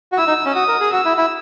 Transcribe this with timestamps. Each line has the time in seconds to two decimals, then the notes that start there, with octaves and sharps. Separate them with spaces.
0.12 F#4
0.18 E4 E6
0.27 D#4
0.46 C#4
0.55 F#4 D#6
0.68 A#4
0.80 G#4
0.92 F#4 E6
1.05 E4
1.17 E4